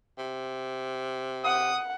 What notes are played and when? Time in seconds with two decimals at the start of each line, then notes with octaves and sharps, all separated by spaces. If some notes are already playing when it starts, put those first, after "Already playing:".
0.18 C3
1.45 F#5 D#6